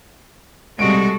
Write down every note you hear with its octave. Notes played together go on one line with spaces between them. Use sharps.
C2 G3 G#3 F#4 A4 D7